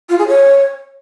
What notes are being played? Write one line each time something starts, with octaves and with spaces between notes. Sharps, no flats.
F4
G#4
C#5